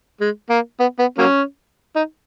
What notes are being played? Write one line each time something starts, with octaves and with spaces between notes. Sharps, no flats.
G#3
A#3
B3
B3
F#3 A#3 C#4
D#4